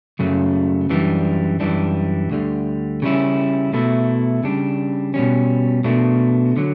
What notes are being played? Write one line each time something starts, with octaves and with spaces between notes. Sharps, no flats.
F#2 C#3 F#3 A3
F#2 E3 G3 D4
F#2 E3 G3 D4
D2 D3 G3
C#3 G3 C#4 E4
B2 A3 E4
C#3 G3 D4
B2 G3 C#4
B2 A3 D4
D3 F#3